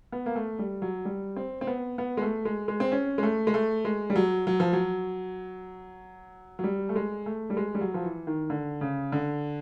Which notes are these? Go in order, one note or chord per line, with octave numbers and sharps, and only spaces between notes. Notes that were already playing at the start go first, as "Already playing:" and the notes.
B3
A#3
A3
G3
F#3
G3
C4
C4
B3
B3
G#3
A3
G#3
G#3
C4
C#4
G#3
A3
G#3
A3
G#3
G3
F#3
F#3
F3
F#3
F#3
G3
A3
G#3
A3
G3
G#3
G3
F#3
F3
E3
D#3
D3
C#3
D3